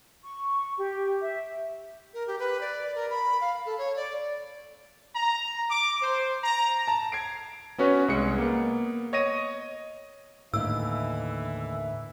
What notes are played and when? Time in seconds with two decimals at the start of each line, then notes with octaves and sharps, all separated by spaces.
0.22 C#6
0.77 G4
1.21 E5
2.14 A#4
2.27 G4
2.39 B4
2.61 D5
2.95 A#4
3.10 B5
3.41 F5
3.65 A4
3.78 C#5
3.96 D5
5.15 A#5
5.70 D6
6.01 C5
6.42 A#5
6.88 A5 A#5
7.12 G#6 C7 D7
7.78 B3 C#4 F#4 B4 C#5
8.08 C2 G#3 C#7
8.38 A#3 B3
9.13 C#5 D#5 A#6 D#7
10.54 D#2 A2 D3 E3 A#3 E5 E6